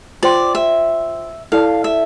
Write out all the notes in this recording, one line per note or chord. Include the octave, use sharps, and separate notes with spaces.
F4 C5 D5 G5 C6
E5
E4 A4 D5 F5 A5
E5